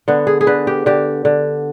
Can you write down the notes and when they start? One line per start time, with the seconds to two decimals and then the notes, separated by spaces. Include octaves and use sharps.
0.08 D3 B3
0.27 G#4
0.41 G#4
0.47 D3 B4
0.67 G4
0.86 D3 G4
1.25 D3